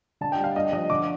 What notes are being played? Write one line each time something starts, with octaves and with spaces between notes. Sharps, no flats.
D3 A5
G5
G3
F5
G2 D#5
F3 D#5
D3 D6